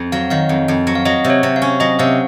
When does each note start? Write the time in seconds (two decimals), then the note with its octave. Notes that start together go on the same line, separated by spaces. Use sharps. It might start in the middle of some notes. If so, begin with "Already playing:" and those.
Already playing: F2
0.12 F#3 F5
0.30 D#3 F5
0.49 F2
0.68 F2
0.87 F#3
0.95 F5
1.05 F#3 D#5
1.24 C3
1.30 C#5
1.43 C3
1.56 F5
1.62 C#4
1.80 F#3 D#5
1.99 C3 F5